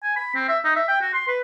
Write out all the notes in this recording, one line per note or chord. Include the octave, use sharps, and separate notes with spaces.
G#5
B5
C4
E5
D#4
E5
G5
F#4
C6
B4